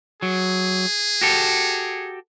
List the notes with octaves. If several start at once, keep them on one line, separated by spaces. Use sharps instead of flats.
F#3 G#4
F#4 G4 A4